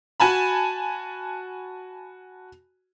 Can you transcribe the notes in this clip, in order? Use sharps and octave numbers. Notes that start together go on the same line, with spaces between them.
F#4 G#5 A5 B5